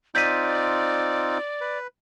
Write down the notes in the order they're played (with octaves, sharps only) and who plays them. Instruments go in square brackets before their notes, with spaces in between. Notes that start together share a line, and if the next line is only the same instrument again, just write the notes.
[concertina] C4 D#4 F4 [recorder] D5 [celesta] G6 B6 D#7
[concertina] B4